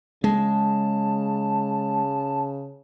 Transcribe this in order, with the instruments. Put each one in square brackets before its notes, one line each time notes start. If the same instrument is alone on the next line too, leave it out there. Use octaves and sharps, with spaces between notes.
[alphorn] C#3 [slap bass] G#3 [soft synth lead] A5